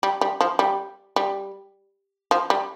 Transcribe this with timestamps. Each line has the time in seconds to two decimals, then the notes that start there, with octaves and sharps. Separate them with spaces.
0.03 G3
0.21 G3
0.41 F3
0.59 G3
1.16 G3
2.31 F3
2.50 G3